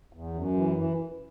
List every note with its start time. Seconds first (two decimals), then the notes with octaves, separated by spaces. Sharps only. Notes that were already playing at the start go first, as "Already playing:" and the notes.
0.13 E2
0.34 F#2
0.54 E3
0.76 E3